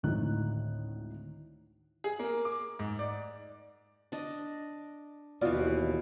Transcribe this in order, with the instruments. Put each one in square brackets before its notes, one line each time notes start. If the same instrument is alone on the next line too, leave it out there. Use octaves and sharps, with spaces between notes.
[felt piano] G#1 D2 A2 D3 D#4 F#6
[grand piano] G#4
A#3
D6
G#2
D5
[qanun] D4 D#5
[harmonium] D#2 [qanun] B2 E3 [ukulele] F4 D5 D#5